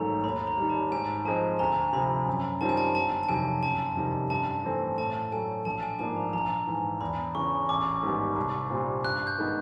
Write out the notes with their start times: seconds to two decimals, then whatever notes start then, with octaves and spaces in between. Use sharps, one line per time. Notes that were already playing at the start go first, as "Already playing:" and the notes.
Already playing: A1 G#2 D#3 F#3 A3 A#5
0.24 D#2 B5
0.47 A#5
0.58 D#3 G3
0.69 A5
0.91 G#2 G#5
1.25 F3 G#3 C4 A5
1.59 D2 A#5
1.93 C3 F3 B5
2.27 F#2
2.61 D#3 G3 C4 F4 A5
2.69 G#5
2.77 A5
2.95 G1 A5
3.23 A5
3.29 F2 C3 D#3 F#3 G#5
3.62 F#1 A5
3.96 F2 C3 D#3 G3
4.30 G2 A5
4.64 E3 A3 C4
4.98 A2 A5
5.32 F#3 A3 G#5
5.65 A#1 A5
5.83 G#5
5.99 G#2 F3 A#3 D4 A5
6.16 A#5
6.33 A#1 A#5
6.67 G#2 E3
7.01 E2 B5
7.35 C#3 E3 C#6
7.69 A1 D6
8.03 G#2 D#3 G3 B3
8.36 C2
8.70 A#2 G3 C4 F4
9.04 G2 F#6
9.27 G6
9.38 D#3 G#3 B3